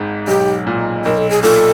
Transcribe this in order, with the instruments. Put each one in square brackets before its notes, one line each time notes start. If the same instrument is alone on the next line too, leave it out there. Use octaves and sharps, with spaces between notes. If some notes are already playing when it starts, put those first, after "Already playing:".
Already playing: [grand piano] G#1 G#2
[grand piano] B1 [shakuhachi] G4
[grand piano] A#2
[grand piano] B1 [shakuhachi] A#4
[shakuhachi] A4
G#4
[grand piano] A#2 [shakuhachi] A4